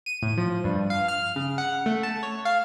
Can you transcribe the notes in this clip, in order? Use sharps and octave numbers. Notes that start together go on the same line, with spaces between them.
D#7
A2
F3
G2
F5
F6
C#3
F#5
A3
A5
C#5
F5